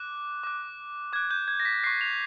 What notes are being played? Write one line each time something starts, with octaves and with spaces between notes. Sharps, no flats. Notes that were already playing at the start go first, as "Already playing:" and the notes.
Already playing: D6 F#6
D6 F#6
D6 F#6 G#6
G6
G#6
A#6
B6
C#6 F#6 C7
F7